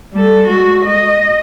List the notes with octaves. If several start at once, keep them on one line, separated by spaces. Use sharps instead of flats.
G3 A4
G#3 F#4
D#5